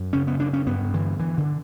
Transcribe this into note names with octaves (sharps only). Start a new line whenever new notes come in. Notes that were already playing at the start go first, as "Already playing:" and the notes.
Already playing: F#2
C#3 C#4
B3
F#2 D4
C#4
G2 B3
D3 E3
D3 E3
D3